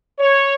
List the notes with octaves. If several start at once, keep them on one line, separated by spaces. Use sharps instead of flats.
C#5